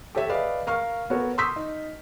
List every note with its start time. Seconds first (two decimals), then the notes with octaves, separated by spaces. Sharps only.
0.15 G4 A4 C#5 E5
0.29 G#4 B4 D5 D#5 F5
0.67 A#4 F5 C#6 F6
1.10 B3 F#4 A4 A#4 C#5
1.38 C6 C#6 D#6 E6 G6 B6
1.56 D#4